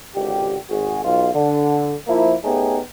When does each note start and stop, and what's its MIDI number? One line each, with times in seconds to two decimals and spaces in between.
0.16 0.57 32
0.16 0.57 37
0.16 0.57 50
0.16 0.57 67
0.70 1.02 32
0.70 1.02 66
0.70 1.02 68
1.05 1.29 35
1.05 1.29 65
1.35 1.94 50
2.08 2.35 53
2.08 2.35 58
2.08 2.35 64
2.43 2.79 57
2.43 2.79 59
2.43 2.79 61
2.43 2.79 63
2.43 2.79 67
2.43 2.79 68